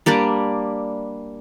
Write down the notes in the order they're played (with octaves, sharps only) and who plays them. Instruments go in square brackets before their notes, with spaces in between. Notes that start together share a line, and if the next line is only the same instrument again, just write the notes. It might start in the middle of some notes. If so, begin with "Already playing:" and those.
[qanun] G3 A#3 D4 D5